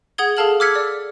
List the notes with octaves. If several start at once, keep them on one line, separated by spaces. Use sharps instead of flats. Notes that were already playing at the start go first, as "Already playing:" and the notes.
G#4 F#5 D#6 G#6 G7
G#4 A4 F5 A5 F6 F#7
D6 E6 F6 G#6 B6 C#7
D5